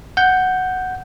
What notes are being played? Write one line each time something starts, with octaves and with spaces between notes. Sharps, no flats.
F#5 G6